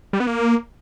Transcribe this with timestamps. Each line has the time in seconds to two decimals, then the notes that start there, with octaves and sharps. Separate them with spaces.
0.13 G3
0.20 B3
0.27 A#3